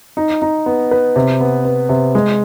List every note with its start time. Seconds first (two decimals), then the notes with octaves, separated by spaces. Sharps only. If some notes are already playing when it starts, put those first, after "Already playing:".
0.17 D#4
0.42 D#4
0.66 B3
0.91 B4
1.16 C3
1.41 B3
1.65 B3
1.89 C3
2.15 G#3